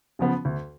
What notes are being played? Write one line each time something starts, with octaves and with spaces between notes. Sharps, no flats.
C#3 F3 B3
D2